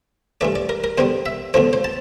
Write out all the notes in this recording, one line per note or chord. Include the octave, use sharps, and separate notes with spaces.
G2 E3 A3 D5
D5
A#4
A#4
E2 D3 G3 C5
E5
E2 D3 F3 A3 C5
C5
A5